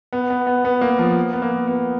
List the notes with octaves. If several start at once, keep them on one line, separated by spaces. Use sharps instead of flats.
B3
B3
B3
B3
A#3
F3
B3
A#3
B3